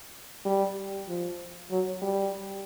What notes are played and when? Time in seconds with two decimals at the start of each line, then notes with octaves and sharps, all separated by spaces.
0.46 G3
1.08 F3
1.71 F#3
2.02 G3